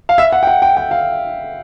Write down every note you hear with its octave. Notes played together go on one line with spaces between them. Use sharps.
F5
E5
F#5
G5
F#5
G5
G5
F5